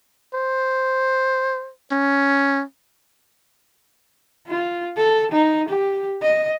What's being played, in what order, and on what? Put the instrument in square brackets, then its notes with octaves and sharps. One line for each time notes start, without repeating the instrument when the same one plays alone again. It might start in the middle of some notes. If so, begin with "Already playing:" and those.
[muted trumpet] C5
C#4
[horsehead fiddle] F4
A4
D#4
G4
D#5